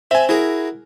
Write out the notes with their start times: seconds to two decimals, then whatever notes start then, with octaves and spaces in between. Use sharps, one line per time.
0.11 C4 E5 G#5
0.29 E4 F#4 G#4 A#4